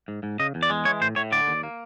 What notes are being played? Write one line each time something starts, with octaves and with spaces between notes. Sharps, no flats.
G#2
G#2
C#3 D#5
E2
D5
G#3
E3 C#5
A2 C5
A2 C#5
D3 D5
D#2
A#3